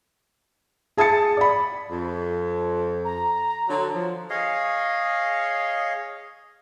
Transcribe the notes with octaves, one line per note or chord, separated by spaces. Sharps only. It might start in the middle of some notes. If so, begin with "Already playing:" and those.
G#4 A5 D#6 A6 C#7
D5 B5
F2
A#5
D3 F#3
F3
G#4 C#5 D#5 F5